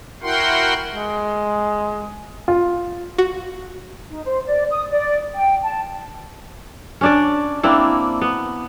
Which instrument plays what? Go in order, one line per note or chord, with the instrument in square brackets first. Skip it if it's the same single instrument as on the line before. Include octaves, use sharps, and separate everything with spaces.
[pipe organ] E4 F#4 A#4 F#5 G5 C6
[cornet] G#3
[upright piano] F4
[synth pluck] F#4
[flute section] D#4
C5
D5
D#6
D5
G5
A5
[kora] C#4 D4 D5
A#3 C4 D4 E4
B3